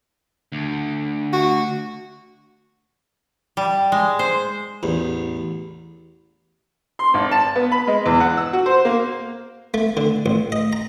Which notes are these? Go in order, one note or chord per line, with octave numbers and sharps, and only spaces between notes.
D2
F#4
G3
G#3
C5
A1 E2
C6
G#1
A5
B3
B5
G#3
E2
F#5
E6
F#4
C5
A#3
A3
D3
A1
D#5
A#5